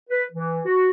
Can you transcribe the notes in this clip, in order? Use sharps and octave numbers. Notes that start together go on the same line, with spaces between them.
B4
E3
F#4